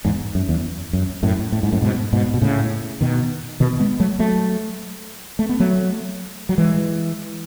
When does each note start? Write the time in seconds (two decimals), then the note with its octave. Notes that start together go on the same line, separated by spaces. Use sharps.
0.05 E2 G#2
0.35 F#2
0.49 E2
0.93 F#2
1.23 F#2 A2
1.52 A2
1.63 G#2
1.72 F#2 A2
1.82 G#2 B2
2.13 G#2 B2
2.34 B2
2.42 A2 C#3
3.01 B2 D#3
3.60 B2 D#3
3.80 G#3 B3
4.00 F#3 A3
4.19 F#3 A3
5.39 A3
5.49 B3
5.60 F#3 A3
6.49 F#3
6.58 E3 G#3